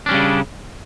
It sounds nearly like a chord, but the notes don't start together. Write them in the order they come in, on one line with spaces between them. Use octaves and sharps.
D4 C#4 G3 C#3